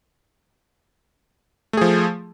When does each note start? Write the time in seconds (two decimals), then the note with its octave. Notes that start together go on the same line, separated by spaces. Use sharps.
1.73 A3
1.77 G#4
1.81 F3